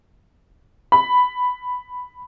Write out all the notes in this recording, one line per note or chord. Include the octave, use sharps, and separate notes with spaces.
B5